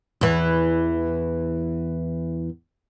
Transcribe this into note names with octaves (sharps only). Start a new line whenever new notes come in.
E2 E3